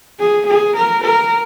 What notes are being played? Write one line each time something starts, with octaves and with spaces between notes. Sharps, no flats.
G#4
G#4
A#4
A#4